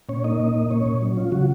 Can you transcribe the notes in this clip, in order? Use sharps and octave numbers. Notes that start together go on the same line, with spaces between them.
A#2 C#4 C#5
A#3 D#4 D#5
A#2
A#3
A#2 C#4 C#5
A#2
F#3
C#4 F4
C#3 F#3 F#4